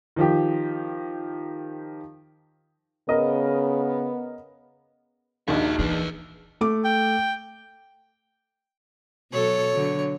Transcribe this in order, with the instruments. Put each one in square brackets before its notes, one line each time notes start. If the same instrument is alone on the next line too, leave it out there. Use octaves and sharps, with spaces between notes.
[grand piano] D#3 F3 G4
[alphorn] C#3 [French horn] B3 [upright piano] A#4 D#5
[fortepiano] A#1 D#2 [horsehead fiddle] D4 D#4 [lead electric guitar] F#4 E5
[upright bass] E3 [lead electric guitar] G#4 B4
[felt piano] A3 D6
[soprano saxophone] G5
[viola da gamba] B2 F#3 A4 [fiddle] C#5
[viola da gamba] D3 F#3